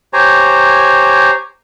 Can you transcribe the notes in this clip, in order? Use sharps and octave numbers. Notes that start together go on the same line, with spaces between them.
G4 C5 C#5 G#5 A#5